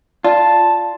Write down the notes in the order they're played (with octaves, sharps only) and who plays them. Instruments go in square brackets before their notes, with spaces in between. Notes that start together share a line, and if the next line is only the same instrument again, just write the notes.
[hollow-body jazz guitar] F4 [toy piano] D5 [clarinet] A5